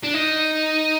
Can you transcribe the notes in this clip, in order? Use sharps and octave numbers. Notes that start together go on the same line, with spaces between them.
D4
D#4